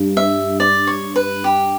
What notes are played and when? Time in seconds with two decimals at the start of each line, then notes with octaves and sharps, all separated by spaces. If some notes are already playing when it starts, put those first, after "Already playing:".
Already playing: G2 G3
0.17 E5
0.60 D5
0.87 C#5
1.16 B4
1.44 G4